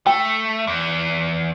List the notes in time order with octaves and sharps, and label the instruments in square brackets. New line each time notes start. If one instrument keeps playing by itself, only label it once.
[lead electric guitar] A3 [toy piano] G5
[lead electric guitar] E2